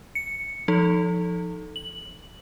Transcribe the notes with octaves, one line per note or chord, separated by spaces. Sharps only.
C#7
F3 D#4 A4
F#7